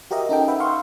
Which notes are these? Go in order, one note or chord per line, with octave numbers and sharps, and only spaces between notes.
F#4 G4 A#4 D#5 E5
C#4 D#4 A4 G5
B4 E5 F#5 G5
E5 F5 C6 C#6